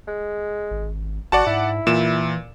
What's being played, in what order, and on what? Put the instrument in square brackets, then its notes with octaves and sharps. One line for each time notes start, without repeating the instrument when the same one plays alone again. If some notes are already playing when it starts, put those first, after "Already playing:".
[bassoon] G#3
[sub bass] G#1
[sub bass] G#1 [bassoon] F#4 [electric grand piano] D5 F#5 A5
[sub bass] G#2 [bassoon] E4
[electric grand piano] A#2 E7 [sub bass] E3